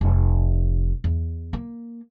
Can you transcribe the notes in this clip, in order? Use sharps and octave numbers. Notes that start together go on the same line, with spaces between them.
F1
E2
A#3